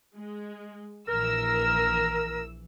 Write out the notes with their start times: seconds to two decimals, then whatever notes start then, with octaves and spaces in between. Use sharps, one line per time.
0.16 G#3
1.08 A#1 E3 A#4 E6